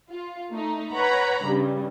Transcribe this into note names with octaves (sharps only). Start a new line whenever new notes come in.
F4
A3 D#4
B4 C#5 F#5 A#5 B5
G2 C#3 G3